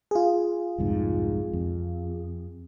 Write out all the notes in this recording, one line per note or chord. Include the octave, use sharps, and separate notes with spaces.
F4 G#4
C2 F2 G#2
F2